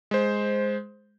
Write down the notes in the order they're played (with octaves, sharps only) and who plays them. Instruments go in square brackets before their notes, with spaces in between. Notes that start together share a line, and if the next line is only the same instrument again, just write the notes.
[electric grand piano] G#3 C5